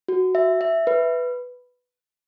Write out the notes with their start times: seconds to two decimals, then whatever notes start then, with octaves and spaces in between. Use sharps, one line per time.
0.08 F#4
0.35 E5
0.61 E5
0.87 B4